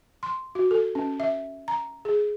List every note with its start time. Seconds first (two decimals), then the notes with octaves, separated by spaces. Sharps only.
0.23 C6
0.55 F#4
0.71 A4
0.95 C#4
1.20 E5
1.68 A#5
2.05 G#4